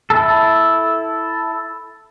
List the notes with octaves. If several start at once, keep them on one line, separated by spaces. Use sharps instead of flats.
E4 A4